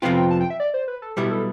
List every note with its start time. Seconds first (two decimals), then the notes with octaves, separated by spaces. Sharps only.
0.02 F2 C3 F3 B3 F4 G5
0.17 G5
0.31 A5
0.41 G5
0.50 E5
0.60 D5
0.74 C5
0.88 B4
1.02 A4
1.17 B1 B2 G3 B3 E4 G4
1.31 A4